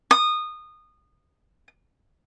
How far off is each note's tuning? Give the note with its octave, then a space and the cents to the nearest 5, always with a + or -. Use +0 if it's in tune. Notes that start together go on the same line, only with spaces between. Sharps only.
D#6 -20